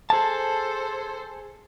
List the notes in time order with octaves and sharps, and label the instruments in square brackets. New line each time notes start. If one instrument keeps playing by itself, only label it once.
[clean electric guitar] G#4 A5 [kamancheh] A4 C5